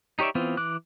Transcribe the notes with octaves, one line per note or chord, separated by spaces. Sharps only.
D#4 G4 C#5 D5 E5
E3 B3 C4 F4
E3 D6 F#6